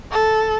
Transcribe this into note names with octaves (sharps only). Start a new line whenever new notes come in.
A4